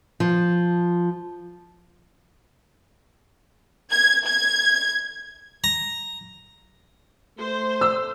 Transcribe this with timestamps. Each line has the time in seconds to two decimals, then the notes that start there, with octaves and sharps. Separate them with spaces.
0.20 F3
3.91 G#6
4.26 G#6
5.64 A#5
7.39 A3 C5
7.81 E6